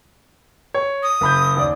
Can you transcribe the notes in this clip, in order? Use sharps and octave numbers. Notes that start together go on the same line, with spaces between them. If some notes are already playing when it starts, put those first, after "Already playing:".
C#5
D#6
F#1 B5 G6
D#2 D5